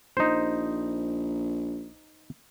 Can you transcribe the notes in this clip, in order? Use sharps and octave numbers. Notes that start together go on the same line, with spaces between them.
A#1 D#4 C5